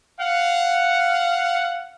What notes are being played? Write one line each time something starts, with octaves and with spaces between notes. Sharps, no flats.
F5 F#5